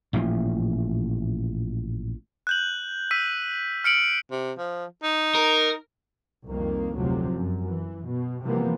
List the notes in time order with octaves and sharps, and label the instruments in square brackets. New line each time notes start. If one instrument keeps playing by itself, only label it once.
[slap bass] A1 A#2 C#3 F3
[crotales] F#6 G6 F#7
E6 B6 D#7
F6 C#7 D7 F#7
[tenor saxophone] C3
F3
D#4
[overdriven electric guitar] A#4
[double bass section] C2 F2 D#3 A#3
F1 D2 C3 F3 F#3
F#2
E3
B2
C3 E3 F3 G3 A#3 B3